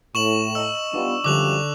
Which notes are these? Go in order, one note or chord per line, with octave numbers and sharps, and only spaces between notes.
A2 C#6 D#7 E7 F#7
D#5 A#5 E6
G3 B3 D4 F4
F#2 D3 F3 G3 D6 F#6 F7